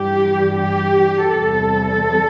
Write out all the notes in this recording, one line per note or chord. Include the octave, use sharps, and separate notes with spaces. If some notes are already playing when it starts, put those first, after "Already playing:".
Already playing: G2 E3 G3 G4
G4
E2 C3 G3 A4